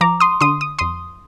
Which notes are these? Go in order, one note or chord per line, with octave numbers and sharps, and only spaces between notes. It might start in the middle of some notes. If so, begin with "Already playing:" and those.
F3 A#5 D6
C6 D#6
D3 C6 D#6
D#6
F2 C6 D#6